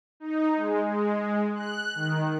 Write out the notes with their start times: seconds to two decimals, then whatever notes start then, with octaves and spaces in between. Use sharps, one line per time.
0.20 D#4
0.56 G#3
0.88 G#3
1.55 F#6
1.95 D#3